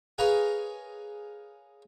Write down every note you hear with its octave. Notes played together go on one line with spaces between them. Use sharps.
G#4 A#4 B4 C#5 F5 A#5